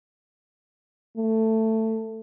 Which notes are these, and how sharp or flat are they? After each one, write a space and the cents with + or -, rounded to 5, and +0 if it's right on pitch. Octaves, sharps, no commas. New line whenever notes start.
A3 +15